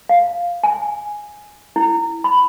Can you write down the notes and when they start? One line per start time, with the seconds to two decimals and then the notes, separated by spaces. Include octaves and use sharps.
0.09 F5
0.64 G#5
1.76 E4
2.24 B5